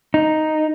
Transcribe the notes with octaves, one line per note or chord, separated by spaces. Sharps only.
D#4